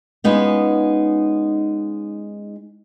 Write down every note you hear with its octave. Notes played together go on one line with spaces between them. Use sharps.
G#3 B3 C#4 D#4 F4